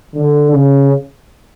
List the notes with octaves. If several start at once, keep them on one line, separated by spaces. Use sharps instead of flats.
D3
C#3